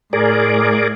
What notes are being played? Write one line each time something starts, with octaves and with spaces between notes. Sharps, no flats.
A2 G#4 A#4 D5